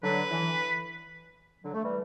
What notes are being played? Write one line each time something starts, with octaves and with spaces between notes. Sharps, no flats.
D3 F#3 B4
E3
D3 F#3
A3
E3 G3